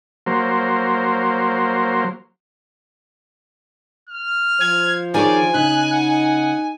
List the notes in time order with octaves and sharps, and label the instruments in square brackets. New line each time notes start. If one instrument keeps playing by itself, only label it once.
[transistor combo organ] F#3 A#3 C5
[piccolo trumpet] F6
[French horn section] F3 C5 [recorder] G#6
[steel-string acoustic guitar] D#3 G#4 C#5 [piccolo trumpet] D5 [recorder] G#5
[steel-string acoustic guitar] C#3 [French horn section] D#4 [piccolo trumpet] F#6
[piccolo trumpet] F#5